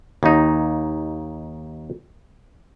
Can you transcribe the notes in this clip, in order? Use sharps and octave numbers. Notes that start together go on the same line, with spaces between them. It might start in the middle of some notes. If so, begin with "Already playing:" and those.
D#2 D#4